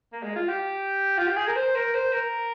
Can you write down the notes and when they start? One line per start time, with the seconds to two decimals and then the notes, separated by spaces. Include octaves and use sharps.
0.13 A#3
0.23 G#3
0.36 F4
0.48 G4
1.18 F4
1.27 G4
1.36 G#4
1.47 A#4
1.56 C5
1.75 A#4
1.94 C5
2.13 A#4